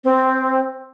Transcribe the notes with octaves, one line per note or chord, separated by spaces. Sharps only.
C4